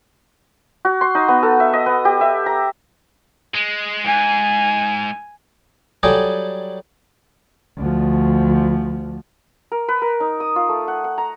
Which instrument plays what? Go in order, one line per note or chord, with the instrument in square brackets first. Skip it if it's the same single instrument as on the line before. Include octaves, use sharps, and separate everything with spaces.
[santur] F#4
C6
D#4
B3
A4
E5
D#5
B3
G4
E5
A#5
[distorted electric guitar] G#3
[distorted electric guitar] G#2 [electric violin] G#5
[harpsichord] F#3 G3 A4 G5 G#5 D#6
[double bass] D2 F3
[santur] A#4
B4
A#4
D#4
D#6
F4
A3
F#5
F#5
A#5